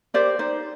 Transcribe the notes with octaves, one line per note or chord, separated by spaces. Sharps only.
G4 A#4 C5 D5
D#4 C5